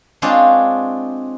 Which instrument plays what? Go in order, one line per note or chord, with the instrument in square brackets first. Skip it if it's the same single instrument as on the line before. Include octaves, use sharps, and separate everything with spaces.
[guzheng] G#3 C4 D4 F4 G#4 C#5